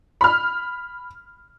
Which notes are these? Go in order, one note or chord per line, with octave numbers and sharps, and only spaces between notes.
B5 F6